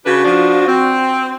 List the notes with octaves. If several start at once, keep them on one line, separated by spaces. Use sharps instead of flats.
C#3 D4 F#4 B4
F3 D4
C4